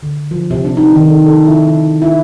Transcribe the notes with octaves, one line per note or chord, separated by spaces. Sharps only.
D3
F3
C3
D4
D#4
D#3
A4
A4
E4
D#4
E4